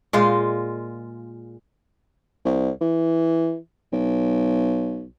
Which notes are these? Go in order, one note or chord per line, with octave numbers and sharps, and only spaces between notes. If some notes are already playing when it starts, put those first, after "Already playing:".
A#2 G#3 F4
C2
E3
B1